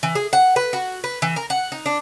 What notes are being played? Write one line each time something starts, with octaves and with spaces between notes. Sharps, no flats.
E3
G#4
F#5
B4
F#4
B4
E3
A#4
F#5
D#4
D4